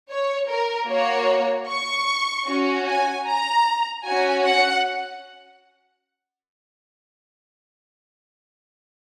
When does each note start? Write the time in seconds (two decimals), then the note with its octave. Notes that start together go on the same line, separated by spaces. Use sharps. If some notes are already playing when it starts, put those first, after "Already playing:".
0.11 C#5
0.50 A#4
0.89 A#3 F#4 C#5
1.68 C#6
2.47 C#4 F#4
2.87 G#5
3.26 A#5
4.05 C#4 F#4 G#5
4.45 F#5